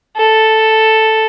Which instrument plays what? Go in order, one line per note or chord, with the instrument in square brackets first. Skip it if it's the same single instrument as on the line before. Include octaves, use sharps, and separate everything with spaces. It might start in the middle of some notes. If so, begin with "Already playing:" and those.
[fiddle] A4